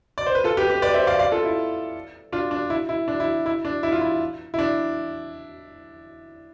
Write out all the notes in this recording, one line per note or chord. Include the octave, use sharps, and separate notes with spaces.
D5
C5
B4
F4 A4
G4 B4
G4 B4
B4 D5
C5 E5
D5 F5
D5 F5
F4 A4
E4
D4 F4
D4
E4
E4
D4
E4
E4
D4
E4
F4
E4
E4
D4